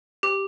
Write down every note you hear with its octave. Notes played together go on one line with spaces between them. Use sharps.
G4